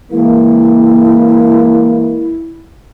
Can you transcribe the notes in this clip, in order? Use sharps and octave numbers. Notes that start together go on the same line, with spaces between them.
E3 G#3 A#3 E4